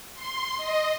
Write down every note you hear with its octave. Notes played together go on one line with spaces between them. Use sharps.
C6
D#5